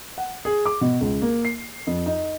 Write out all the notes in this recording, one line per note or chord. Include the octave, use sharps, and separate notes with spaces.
F#5
G#4
D6
B2
C#2
A#3
C7
F2
D#4